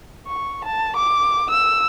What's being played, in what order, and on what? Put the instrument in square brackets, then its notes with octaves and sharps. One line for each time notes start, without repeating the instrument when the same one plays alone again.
[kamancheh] C#6
A5
D6
E6